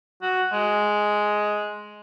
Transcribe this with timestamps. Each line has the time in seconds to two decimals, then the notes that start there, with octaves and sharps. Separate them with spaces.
0.22 F#4
0.52 G#3